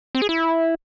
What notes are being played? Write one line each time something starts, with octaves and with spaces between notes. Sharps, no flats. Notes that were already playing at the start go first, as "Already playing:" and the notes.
C4
G#4
E4